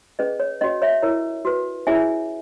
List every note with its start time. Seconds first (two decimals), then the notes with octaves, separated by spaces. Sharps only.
0.19 C#4 G#4 B4 D#5
0.40 C#5
0.61 C#4 F#4 C#5 D#5
0.82 C#5 E5
1.02 E4 A#4 C#5
1.45 F#4 B4
1.87 C#4 E4 G#4 C#5 E5 G#5